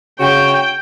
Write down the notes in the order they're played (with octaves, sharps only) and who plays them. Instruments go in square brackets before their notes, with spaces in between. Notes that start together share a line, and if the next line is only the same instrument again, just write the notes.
[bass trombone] C#3 [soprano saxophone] F#4 [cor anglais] C#5 [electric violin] G5